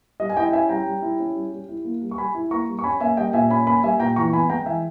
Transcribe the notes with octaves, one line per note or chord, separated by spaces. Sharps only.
G3 D#5
G#5
E4 D#5 G5
C#4 E5 G#5
G3 G5 A#5
G3
E4
C#4
G3
G3
E4
A#3
G3
C#6
G3 G#5 B5
E4
A#3 A#5 C#6
G3
C#6
C#4 G#5 B5
A#3 E5 G#5
G3 D#5 G5
A#2 E5 G#5
C#4 G#5 B5
A#3 G#5 B5
G3 E5 G#5
A#2 G5 A#5
E3 A#5 C#6
B3 G#5 B5
G#3 G5 A#5
E3 E5 G#5